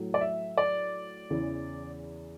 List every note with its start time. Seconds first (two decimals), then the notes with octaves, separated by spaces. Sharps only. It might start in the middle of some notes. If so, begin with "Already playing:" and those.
Already playing: A2 F#3
0.14 D5
0.21 E5
0.57 D5
1.30 E2 C#3 E3